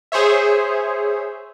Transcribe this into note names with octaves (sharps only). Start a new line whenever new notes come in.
G#4 C5 C#5 E5